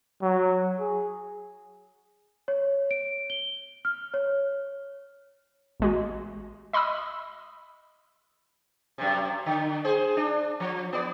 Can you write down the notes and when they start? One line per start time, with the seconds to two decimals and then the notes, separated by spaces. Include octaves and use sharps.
0.22 F#3
0.80 G#4
2.48 C#5
2.91 D7
3.30 G7
3.85 F6
4.14 C#5
5.80 A1 G#3 F#4
6.73 D#5 B5 C6 D#6 E6
8.98 F#2 C3
9.46 D3
9.84 G#4 C5
10.17 D4
10.60 F3
10.93 B3 D5